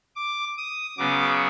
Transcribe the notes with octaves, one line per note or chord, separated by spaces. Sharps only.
D6
D#6
C#3 F#3 B3 D6